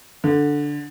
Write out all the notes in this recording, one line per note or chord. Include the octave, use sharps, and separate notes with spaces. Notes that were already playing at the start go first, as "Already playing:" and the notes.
D3